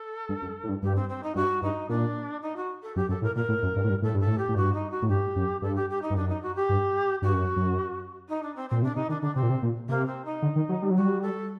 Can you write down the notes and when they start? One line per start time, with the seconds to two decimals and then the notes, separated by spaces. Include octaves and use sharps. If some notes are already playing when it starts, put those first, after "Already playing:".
Already playing: A4
0.29 G2
0.42 F#2
0.63 A2
0.69 G2
0.82 G2 G4
0.95 C4
1.09 C4
1.23 D#4
1.35 G2 F#4
1.62 G2 D#4
1.89 A#2 D4
2.42 D#4
2.56 F#4
2.82 A4
2.96 F#2 G4
3.09 F#2 A4
3.22 A2 A#4
3.35 A#2 A#4
3.49 A2
3.63 F#2
3.76 G2
3.84 A2
3.90 G2
4.02 A2 A4
4.15 G2 A4
4.27 A2
4.38 G4
4.49 A2
4.55 G2 F#4
4.74 D#4
4.91 F#4
5.02 A2
5.08 G2 G4
5.36 F#2
5.62 G2 A4
5.75 G4
5.89 G4
6.02 D#4
6.10 G2
6.16 F#2 D4
6.28 D#4
6.42 F#4
6.55 G4
6.69 G2
7.22 G2 F#4
7.33 F#2
7.56 F#2
8.28 D#4
8.43 D4
8.56 C4
8.69 A#2 C4
8.82 C3 D4
8.95 C3 D#4
9.09 D#3 D4
9.22 D3 D4
9.35 C3 C4
9.43 A#2
9.50 C3
9.62 A#2
9.89 C3 A#3
10.06 C4
10.25 D#4
10.42 D3
10.56 D#3
10.69 F#3
10.82 G3
10.91 F#3
10.96 G3 F#4
11.22 A4